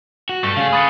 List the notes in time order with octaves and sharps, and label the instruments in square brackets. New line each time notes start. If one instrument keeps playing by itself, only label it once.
[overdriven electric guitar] F#4
[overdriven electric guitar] G2 [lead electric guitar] A3
[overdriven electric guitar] C#3 G#4 [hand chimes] F5
[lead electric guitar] A3 B4 [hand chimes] D#6 A6 C#7